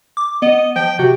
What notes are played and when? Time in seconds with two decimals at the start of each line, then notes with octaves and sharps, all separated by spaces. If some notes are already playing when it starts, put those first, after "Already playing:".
0.17 D6
0.42 B3 D#5
0.76 F3 G5
0.99 C3 F#4